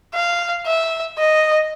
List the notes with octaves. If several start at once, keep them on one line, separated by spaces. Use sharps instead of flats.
F5
E5
D#5